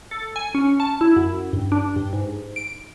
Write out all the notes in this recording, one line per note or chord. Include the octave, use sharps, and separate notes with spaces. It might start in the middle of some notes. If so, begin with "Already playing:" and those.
A4
G#5
C#4
A5
E4
F#2
G2
D4
G2
G#2
D7